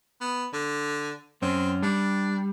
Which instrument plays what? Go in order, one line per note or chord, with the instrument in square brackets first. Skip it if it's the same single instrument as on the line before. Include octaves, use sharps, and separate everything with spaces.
[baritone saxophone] B3
D3
[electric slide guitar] F#2 C#4 [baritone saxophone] C4
[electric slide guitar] G3 [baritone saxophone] D4